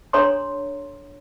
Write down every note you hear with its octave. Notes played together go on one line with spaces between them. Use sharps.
D4 A4 C#5 A#5 C6